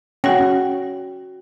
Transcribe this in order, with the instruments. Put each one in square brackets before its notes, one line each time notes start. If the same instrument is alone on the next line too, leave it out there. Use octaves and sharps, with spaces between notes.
[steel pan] C#4 [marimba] F#4 F#5 A#6 [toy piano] G5